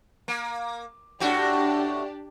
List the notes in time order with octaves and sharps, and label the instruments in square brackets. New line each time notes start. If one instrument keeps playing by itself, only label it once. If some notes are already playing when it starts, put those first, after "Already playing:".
[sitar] A#3
[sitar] A2 F#4 [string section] D4 G4